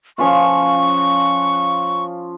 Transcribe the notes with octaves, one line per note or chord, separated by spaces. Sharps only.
F3 C#4 F4 C#6